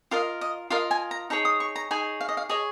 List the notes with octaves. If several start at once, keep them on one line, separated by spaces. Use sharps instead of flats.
F4 A#4 D#5 F5
D#5
F4 A#4 D#5 F5
G#5
A#5
D#4 G#4 C#5 A#5
D#6
C#6
A#5
D#4 G#4 C#5 G#5
F5
D#5
F5
G#4 C#5 D#5